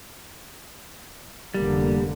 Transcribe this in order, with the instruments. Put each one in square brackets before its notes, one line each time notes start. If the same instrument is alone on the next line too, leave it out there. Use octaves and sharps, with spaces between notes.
[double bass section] F1 D3 A#3 [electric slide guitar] G3